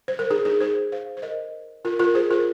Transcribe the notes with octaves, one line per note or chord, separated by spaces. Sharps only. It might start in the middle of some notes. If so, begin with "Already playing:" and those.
C5
A#4
D#4 G#4
D#4 G#4
G#4 C5
C5 F5
C5
A#4 D#5
F4 A#4
F4 A#4
G#4 C5
F4 A#4